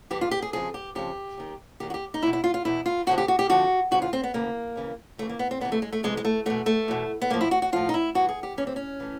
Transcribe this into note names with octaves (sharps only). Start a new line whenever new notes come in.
G2 E3 G4
F4
G4
G#4
F2 C#3 F3 G#4
G4
F2 C#3 F3 G4
D#2 D#3
D#2 D#3 G4
F#4
G4
D#4
E2 B2 E4
E4
F4
F4
E2 B2 E4
F4
F2 D3 F3 F#4
G4
F#4
G4
F2 D3 F3 F#4
D2 C#3 E3 F#4
F4
C4
B3
D2 C#3 E3 A#3
D#2 C#3 E3
D#2 C#3 E3 A3
A#3
B3
C4
F2 C3 E3 B3
A3
G#3
A3
F2 C3 E3 G#3
G#3
A3
E2 B2 A3
A3
E2 B2
B3
A2 F3 A#3
E4
F#4
F#4
A2 F3 F4
D#4
E4
G2 E3 F#4
G#4
G4
G2 E3 C#4
C4
C#4
A2 E3